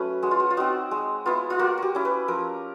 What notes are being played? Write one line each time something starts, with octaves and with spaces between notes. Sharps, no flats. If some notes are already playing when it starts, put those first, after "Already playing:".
Already playing: F#3 A3 C#4 B4
G#3 F#4
F4
F#4
F4
C4 D#4 F#4
G#3
B3 E4 F4
F4
A#3 F#4
F#4 G4
C#4 E4
B4
F3 A#4